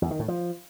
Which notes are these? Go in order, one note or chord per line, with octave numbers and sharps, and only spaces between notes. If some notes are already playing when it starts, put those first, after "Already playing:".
E2
D#3
A2
F3